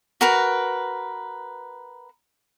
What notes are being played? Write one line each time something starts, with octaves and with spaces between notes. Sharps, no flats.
F#4 A#4 B4